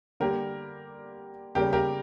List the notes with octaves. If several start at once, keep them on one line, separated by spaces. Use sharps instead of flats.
D3 G3 A#3 G4 A#4
C#3 G3 A#3 G4 A#4
G4 A#4